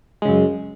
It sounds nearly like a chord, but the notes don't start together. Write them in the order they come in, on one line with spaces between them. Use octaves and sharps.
G#3 C#3 F#2